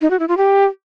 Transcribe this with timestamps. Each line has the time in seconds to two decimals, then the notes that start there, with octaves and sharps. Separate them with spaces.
0.01 D#4
0.10 F#4
0.19 E4
0.28 F4
0.37 G4